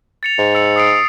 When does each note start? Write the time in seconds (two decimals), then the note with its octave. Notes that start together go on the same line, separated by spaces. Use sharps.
0.23 A6 C#7 F7
0.39 G#2
0.55 E6 C#7
0.76 D#6 C7 D7